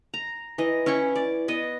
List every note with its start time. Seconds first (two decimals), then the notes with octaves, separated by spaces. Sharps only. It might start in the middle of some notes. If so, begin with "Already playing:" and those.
0.14 A#5
0.58 E3 D#5
0.86 C#4 E4 G5 C#6
1.15 D5
1.48 B3 D#5